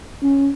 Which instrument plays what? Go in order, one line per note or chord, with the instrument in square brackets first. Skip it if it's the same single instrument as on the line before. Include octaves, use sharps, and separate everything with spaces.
[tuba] C#4